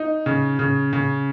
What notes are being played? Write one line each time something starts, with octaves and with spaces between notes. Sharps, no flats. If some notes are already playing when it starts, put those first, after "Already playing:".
Already playing: D#4
C#3
C#3
C#3